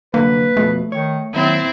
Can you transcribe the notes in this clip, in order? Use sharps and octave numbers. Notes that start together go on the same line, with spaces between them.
C2 F#2 D3 A#3 B4
F2 B2 A3
D#3 C#5
D#2 F#3 C4 E4